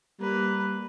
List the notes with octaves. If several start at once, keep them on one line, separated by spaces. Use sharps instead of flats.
G3 A#3 B4